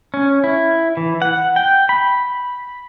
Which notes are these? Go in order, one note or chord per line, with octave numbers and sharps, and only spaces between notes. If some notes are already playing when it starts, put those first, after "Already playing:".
C#4
E4
E3
F#5
G5
B5